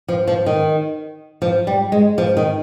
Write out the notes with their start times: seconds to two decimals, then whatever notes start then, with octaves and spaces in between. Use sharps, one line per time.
0.08 F3
0.27 F3
0.46 D#3
1.42 F3
1.67 G3
1.92 G#3
2.18 F3
2.37 D#3